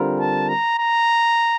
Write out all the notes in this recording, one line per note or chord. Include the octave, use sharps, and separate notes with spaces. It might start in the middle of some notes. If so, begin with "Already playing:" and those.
Already playing: D3 G3 C4 F4 A#4
A5
A#5
A#5